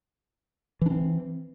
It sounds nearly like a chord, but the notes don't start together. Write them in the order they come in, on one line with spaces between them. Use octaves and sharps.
E3 D4 C4